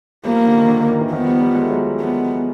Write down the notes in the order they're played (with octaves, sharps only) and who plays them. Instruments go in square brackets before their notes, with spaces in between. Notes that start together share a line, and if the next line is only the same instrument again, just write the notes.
[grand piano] F3 G3 [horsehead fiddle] A#3
[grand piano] D3
D#3
D3
D#3
D#3
D3 E3
[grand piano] D#3 F3 [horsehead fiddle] B3
[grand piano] F3 G3
F3 G3
G#3
A3
F#3 G#3
[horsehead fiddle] B3